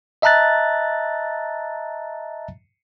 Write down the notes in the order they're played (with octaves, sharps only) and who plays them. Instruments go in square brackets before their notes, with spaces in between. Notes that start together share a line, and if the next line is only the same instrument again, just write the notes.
[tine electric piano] D#5 E5 A5 A#5 F#6 A6